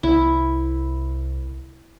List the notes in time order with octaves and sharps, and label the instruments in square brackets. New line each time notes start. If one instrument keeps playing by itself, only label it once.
[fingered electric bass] C2 [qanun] E4